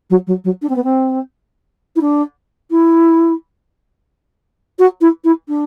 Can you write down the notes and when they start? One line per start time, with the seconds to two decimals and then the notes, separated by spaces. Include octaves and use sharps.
0.10 F#3
0.27 F#3
0.44 F#3
0.62 D4
0.69 C4
0.76 B3
0.84 C4
1.96 E4
2.01 D4
2.71 E4
4.79 F#4
5.01 E4
5.24 E4
5.48 D4